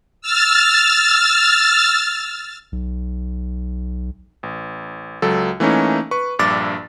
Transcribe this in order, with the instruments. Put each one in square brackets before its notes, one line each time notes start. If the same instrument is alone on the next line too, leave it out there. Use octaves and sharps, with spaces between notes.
[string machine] E6 F6 A6
[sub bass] B1
[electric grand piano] A1
C#2 F#3 A4
E3 A3 A#3 C#4 D#4
B4 C#6
A#1 G2 D6 A6